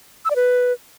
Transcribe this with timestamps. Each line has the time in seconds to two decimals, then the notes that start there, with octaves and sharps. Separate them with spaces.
0.25 E6
0.30 D5
0.36 B4